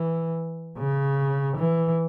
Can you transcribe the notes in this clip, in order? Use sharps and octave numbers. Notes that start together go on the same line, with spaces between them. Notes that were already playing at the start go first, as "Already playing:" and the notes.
Already playing: E3
C#3
E3